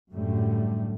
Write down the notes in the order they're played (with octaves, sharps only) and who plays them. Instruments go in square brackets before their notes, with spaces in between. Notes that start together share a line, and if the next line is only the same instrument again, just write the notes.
[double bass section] F#2 A2 D3 G3 A3